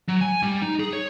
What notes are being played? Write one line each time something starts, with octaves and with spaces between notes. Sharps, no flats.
F#3
G#5
G3
D#4
G#4
C#5